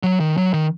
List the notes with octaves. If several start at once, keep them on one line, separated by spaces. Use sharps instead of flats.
F#3
D#3
F#3
D#3